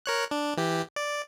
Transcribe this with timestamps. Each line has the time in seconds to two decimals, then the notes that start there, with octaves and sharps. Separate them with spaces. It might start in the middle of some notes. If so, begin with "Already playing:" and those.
0.06 A#4 C#5 F#6
0.31 D4
0.57 E3 G4
0.96 D5